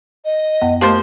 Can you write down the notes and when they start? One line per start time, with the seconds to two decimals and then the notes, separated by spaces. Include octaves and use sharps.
0.25 D#5
0.61 F#2 B3 F#5
0.81 F3 A3 A#3 G4 C5